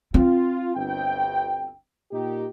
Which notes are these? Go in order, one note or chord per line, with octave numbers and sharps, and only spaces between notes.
C4 F4
G1 D2 G5
A#2 D#4 G4